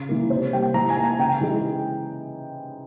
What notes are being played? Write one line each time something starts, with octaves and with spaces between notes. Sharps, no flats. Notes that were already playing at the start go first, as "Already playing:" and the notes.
Already playing: C#3
E3 A#3
C3 C5
G3 A#3 G5
E3 A#5
G#5
A#3
G#5
C#3 G5
E3 G#3